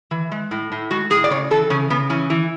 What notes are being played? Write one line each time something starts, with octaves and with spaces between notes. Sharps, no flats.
E3
G#3
A2
A2
G#3 F#4
A2 G#4
D5
C#3 C#5
E3 A4
C#3 C#4
C#3 B3
E3 C#4
E3